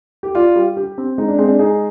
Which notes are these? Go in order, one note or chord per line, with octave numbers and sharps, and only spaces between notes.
G4
F4 D5
G3
G4
C4
G#3 D#4
D4
G#3 C4
D4
D#4 G#4